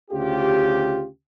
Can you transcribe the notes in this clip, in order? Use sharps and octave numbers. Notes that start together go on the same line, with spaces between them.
D2 C#3 F4 G4